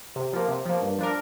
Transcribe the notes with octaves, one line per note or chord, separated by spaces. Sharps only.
C3
F3 A#3
C3
F3 A#3
G2
F3 D4 A#4